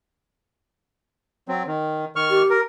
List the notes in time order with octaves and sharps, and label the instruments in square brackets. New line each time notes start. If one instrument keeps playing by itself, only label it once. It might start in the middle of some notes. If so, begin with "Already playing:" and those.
[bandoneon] F#3 C4
D#3
D#3 C#6 F6
[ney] G4
[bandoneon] A#4